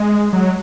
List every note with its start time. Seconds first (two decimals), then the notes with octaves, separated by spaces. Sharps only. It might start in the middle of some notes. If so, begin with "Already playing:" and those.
Already playing: G#3
0.33 F#3